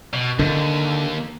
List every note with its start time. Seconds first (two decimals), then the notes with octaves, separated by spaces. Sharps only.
0.14 B2
0.39 D#2 D3